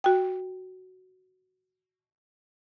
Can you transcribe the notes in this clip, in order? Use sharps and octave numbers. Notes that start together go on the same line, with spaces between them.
F#4 G5